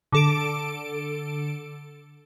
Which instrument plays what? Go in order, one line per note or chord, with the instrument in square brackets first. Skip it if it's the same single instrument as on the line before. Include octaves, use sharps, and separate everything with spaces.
[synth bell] D3 A4 D7